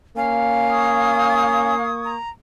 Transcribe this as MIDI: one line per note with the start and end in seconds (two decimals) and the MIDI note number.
0.17 2.18 58
0.17 1.75 61
0.17 1.87 77
0.70 2.14 85
0.70 2.14 87
0.70 2.14 92
2.05 2.30 82